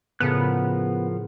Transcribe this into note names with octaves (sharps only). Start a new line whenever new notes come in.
A2 C#3 F3 B3 A#4 F#6 C#7